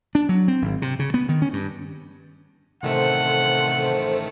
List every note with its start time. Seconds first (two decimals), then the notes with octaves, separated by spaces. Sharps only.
0.15 D4
0.29 F#3
0.48 C4
0.62 G#1
0.82 C3
0.99 C#3
1.14 B3
1.29 D#3
1.42 C#4
1.53 G2
2.83 A1 C3 D#3 A3 A4 C5 F#5